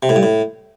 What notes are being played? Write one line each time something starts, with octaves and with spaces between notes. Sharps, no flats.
C3
A2
G2
A2